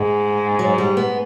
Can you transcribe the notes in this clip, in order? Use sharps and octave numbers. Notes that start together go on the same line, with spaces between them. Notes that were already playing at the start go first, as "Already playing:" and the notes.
Already playing: G#2 G#3
F#3
G3
B3